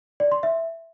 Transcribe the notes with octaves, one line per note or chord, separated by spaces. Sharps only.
D5
C6
E5